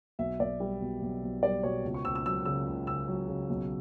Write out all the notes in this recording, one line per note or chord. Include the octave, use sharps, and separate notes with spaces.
B1 E5
B1 D5
G3
B2
B1
B1
G3 D5
B2 C#5
C#2
C#6
C#2 E6
E6
F#3 E6
C#3 E6
C#2
C#2 E6
F#3
C#3
B1